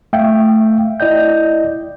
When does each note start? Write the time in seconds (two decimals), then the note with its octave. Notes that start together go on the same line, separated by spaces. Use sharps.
0.13 A3 E5 F5 G5
1.00 E4 D5 D#5 G6